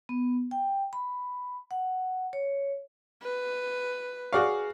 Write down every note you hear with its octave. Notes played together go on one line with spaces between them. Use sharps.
B3
G5
B5
F#5
C#5
B4
F#4 G#4 D5 F5 C#6